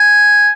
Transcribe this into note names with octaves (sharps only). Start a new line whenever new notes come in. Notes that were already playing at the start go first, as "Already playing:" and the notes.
Already playing: G#5